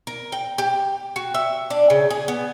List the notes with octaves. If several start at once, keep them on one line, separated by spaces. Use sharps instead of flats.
A#4
G5
G4
F#4
E5
D4
C#3
G#4
B3